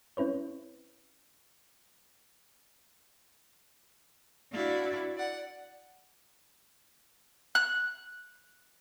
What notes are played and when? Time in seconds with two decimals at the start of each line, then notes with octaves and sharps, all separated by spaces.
0.17 C4 C#4 E4 B4 C#5
4.52 D4 E4 F#4 D5 F5
5.15 D5 F#5
7.55 F#6